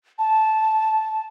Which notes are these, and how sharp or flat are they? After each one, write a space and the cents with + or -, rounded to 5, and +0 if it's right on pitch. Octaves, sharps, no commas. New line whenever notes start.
A5 -10